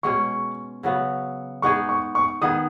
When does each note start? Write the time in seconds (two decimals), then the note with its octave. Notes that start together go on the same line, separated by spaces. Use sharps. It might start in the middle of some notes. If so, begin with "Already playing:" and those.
0.03 B2 G#3 C#4 C#6
0.83 C#3 F#3 B3
1.62 G#3 B3 D#4 G#4 C#6
1.89 C#6
2.15 C#6
2.42 D#3 B3 G#4 D#6